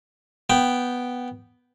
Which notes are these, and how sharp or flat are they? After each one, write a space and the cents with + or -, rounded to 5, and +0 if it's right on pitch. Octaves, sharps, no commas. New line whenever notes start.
B3 +0 G5 -5